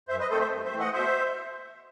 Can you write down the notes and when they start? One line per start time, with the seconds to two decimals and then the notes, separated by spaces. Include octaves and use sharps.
0.08 F#2 C5 E5
0.19 B4 D#5
0.29 D#3 A3 C4 A4 C5
0.40 C5 E5
0.52 G2
0.65 C5 E5
0.72 E3 A3 C4
0.80 D#5 F#5
0.93 B2 C5 E5